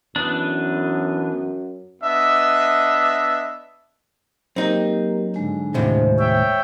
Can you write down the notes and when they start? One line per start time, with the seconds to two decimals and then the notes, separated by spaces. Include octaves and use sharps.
0.16 F#2 E3 B3 D4
2.02 B3 D4 D#5 E5
4.56 F#3 A#3 C4 D#4 G4 A#4
5.36 G#2 D3 G#3
5.74 D#2 A2 C3 C5
6.19 C#5 E5 G5